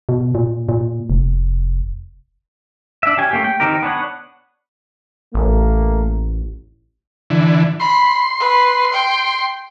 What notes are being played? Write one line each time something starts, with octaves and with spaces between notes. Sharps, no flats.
B2
A#2
A#2
F1
D4 E5
C#4 G4 G#5
A3 A#3 G4
G5
D#3 C4 D#4 G4 A#4
B3 D4 C#5 F#5
A1 A3 A#3
D3 E3
B5 C6
B4
G5